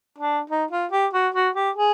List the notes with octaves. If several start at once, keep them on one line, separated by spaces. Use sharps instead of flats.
D4
D#4
F4
G4
F#4
F#4
G4
G#4